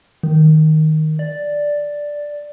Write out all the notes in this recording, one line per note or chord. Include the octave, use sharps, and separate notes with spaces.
D#3
D5